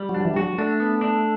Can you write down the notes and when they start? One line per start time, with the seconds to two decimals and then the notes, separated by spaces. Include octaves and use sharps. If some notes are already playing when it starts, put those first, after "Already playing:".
Already playing: G3
0.09 F#3
0.14 D4
0.20 F#3
0.25 E3
0.34 G3
0.36 F#4
0.42 F#3
0.58 A3 D4
0.80 B3
1.01 D4